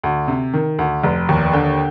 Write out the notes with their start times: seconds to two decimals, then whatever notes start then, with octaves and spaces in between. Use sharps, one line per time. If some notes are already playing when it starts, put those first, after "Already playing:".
0.03 D2
0.28 C3
0.54 D#3
0.79 D2
1.04 F1
1.29 D#2
1.53 D3 G5